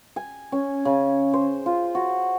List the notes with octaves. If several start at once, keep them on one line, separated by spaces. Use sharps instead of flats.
G#5
C#4
C#3
C5
F4
F#4